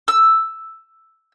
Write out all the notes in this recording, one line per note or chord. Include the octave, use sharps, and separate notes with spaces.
E6